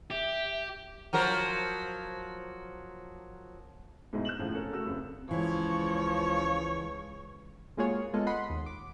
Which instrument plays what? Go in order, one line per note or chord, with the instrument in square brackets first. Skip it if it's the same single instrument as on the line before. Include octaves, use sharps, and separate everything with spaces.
[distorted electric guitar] G4 [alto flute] E5
[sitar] F3 F#3 A#4
[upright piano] G#2 B2 G#3 D#4 E4
F#6 G6 E7 F#7
F2 A2 C#3 F3
C#4 A4 A#4
C#3 A3 F#4 E6 E7
F1 C2 F2 C#3
[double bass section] C#2 C#3 [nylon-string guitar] E3 [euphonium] F3 [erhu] C#5
[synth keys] G#3 A#3 F4 F#4 G#4 C#5
G#3 B3 F4 G#4 A4 D#5
D#5 F#5 B5 C6
D#2
D6